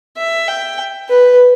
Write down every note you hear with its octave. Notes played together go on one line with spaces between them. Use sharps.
E5
G5
B4